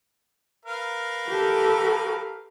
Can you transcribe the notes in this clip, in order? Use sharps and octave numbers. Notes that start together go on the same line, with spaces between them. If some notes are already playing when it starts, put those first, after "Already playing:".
A#4 B4 F5
G4 A4